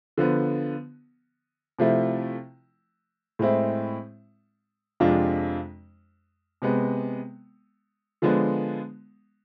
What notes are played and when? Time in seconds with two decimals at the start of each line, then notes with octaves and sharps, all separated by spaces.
0.18 D3 F3 B3
1.79 C3 F3 A3 E4
3.39 A2 G#3 C4 E4
5.00 F2 C3 G#3 D4 F4
6.62 C3 G#3 B3
8.22 D3 F3 G#3 B3 D4